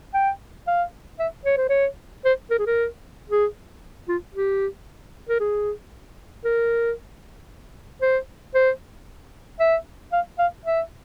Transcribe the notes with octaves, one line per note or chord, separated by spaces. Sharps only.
G5
F5
E5
C#5
C5
C#5
C5
A#4
G#4
A#4
G#4
F4
G4
A#4
G#4
A#4
C5
C5
E5
F5
F5
E5